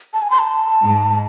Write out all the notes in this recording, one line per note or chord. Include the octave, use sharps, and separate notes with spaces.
A5
G#5
C6
A5
G#2